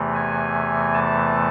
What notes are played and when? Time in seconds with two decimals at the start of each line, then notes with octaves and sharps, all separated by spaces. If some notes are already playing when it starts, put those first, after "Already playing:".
Already playing: E2 C3 E3 A3
0.15 G#5
0.94 A5